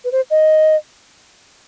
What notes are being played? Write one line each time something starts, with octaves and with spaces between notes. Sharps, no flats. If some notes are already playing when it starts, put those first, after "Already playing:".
B4
C5
D#5